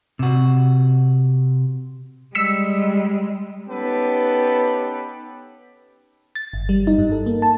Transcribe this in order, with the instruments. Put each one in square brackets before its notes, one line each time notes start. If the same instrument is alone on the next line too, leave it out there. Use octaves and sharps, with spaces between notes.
[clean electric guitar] C3 F#4
[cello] G3 G#3 [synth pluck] E6 B6 C#7
[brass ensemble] B3 C#4 D#4 G4 A4 B4
[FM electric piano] A6
G1
G3
D#4
G2
A4
A#3
A5